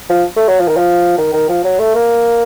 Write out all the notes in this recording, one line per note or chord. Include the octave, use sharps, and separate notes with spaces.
F3
A3
F#3
F3
D#3
F3
D#3
D#3
F3
F#3
A3
A#3